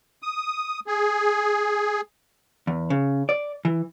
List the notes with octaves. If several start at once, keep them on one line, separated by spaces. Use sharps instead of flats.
D#6
G#4
E2
C#3
D5
E3